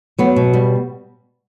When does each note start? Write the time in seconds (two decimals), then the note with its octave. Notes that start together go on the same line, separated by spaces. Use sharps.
0.19 F#3 B3
0.36 B2
0.53 G3